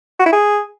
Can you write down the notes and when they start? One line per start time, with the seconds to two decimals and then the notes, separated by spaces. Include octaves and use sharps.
0.19 F#4
0.26 E4
0.33 G#4